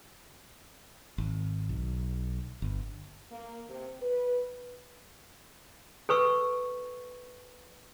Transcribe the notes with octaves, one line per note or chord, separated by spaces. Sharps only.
G#1
B1
G1
A#3
C3
B4
A4 B4 C#6 E6